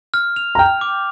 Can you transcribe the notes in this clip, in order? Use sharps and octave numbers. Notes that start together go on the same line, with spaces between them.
F6
F7
A#5
G5 F6
D6